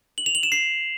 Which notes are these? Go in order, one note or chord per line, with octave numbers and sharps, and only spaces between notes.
F#7
F7
F#7
E7
C7